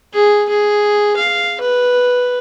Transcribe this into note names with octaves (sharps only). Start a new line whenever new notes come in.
G#4
G#4
F5
B4